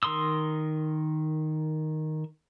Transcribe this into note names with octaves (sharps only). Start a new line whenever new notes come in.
D#3 A#4 C6 D#6 E6